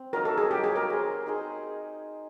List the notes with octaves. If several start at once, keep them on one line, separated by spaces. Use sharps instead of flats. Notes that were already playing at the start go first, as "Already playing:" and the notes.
Already playing: C4
F#3 A#3 D#4 A#4
A4
G#4
F#3 A#3 D#4 G4
G#4
A#4
D#4 G#4 C5
D#4 G#4 C5